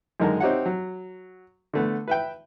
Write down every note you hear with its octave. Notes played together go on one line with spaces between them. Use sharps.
F#2 D3 D#3 G#3 A#4 A5
C4 D#4 G4 C#5 E5 F#5
F#3
D3 A3 B3
B4 E5 G5